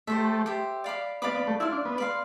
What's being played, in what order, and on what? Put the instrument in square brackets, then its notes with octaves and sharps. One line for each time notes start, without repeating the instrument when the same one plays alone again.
[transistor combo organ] A3 [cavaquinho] G4 C5 E5
[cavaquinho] G4 C5 E5
D5 F5 B5 D6
[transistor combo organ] B3 [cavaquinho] D5 F5 B5 D6
[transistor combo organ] B3
A3
[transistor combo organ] E4 [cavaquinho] D5 F5 C6
[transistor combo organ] D4
B3
[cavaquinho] D5 F5 C6